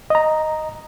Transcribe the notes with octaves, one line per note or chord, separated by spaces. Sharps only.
D#5 A#5